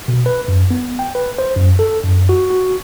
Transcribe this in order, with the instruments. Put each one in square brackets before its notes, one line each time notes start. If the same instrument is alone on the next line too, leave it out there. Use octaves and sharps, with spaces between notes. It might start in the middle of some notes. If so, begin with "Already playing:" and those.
[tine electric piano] B2
B4
F#2
B3
G5
B4
C5
F#2
A4
F#2
F#4
F#4